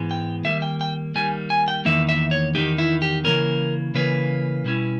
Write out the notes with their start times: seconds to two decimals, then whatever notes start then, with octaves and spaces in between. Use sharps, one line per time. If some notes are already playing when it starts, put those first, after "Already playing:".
Already playing: G#2 E3 G#3 B3
0.11 G5
0.45 D#3 G3 A#3 E5
0.62 G5
0.81 G5
1.15 D#3 G3 A#3 G#5
1.50 G#5
1.68 G5
1.85 E2 D#3 A#3 D#4 E5
2.09 E5
2.31 C#5
2.55 E2 D#3 A#3 D#4 G4
2.78 E4
3.02 G4
3.24 C#3 E3 A#3 C#4 A#4
3.95 C#3 E3 A#3 C#4 B4
4.65 B2 G3 C#4 E4